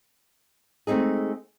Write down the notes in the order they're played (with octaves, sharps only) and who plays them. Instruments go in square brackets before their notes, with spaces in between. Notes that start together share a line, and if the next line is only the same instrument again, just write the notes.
[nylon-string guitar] G#3 A3 C4 D#4 G#4